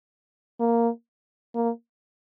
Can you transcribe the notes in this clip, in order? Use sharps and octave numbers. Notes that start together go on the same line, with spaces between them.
A#3
A#3